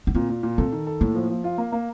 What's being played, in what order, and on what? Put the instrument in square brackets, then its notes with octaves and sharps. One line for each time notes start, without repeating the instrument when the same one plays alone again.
[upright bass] D4
[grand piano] A#2 [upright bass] C4
[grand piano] A#2
A#2
[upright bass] C4 [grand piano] A4
[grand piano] D#3
A4
[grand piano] A2 [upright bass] A#3
[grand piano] F3
F3
F4
A#3
A#3